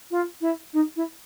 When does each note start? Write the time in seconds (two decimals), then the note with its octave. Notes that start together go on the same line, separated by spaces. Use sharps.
0.10 F4
0.40 E4
0.73 D#4
0.96 E4